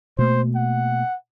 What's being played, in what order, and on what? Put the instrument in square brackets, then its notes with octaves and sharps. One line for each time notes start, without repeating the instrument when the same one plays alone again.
[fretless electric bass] B2 A3 A#3 [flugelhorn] C5
[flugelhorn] F#5